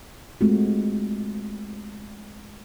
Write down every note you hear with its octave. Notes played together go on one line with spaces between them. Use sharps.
G#3 A3 C4 F4 F#4